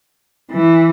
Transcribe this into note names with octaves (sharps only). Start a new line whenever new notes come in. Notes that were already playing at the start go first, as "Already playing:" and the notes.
E3